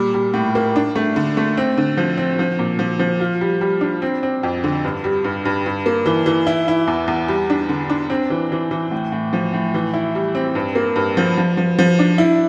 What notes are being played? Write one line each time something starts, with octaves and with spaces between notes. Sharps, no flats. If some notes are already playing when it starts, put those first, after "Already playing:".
Already playing: A#2 G3
G3
A2
A#3
D4
A3
D3
A3
C4
D3
F3
C4
F3
A#2
F3
F3
F4
G3
G3
D4
C4
C4
F2
D3
G2
G3
G2
G2
G2
A#3
E3
E3
E4
E4
E2
E2
G3
D4
D3
D4
C4
E3
E3
E3
A2
A2
F3
A2
E3
E4
G3
C4
G2
A#3
G2
F3
F3
F3
F3
D4
E4